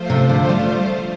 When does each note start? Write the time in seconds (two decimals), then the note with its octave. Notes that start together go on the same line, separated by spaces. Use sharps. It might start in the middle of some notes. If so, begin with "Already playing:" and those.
Already playing: F3 A3 F4 C5
0.10 C3
0.29 D3
0.49 G3